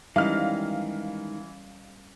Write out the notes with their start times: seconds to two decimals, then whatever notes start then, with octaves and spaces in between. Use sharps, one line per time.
0.16 G#2 D#3 E3 G3 C#4 D#5 F5 F6